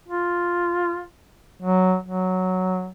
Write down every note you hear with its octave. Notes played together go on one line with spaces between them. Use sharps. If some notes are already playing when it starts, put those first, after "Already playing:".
F4
F#3
F#3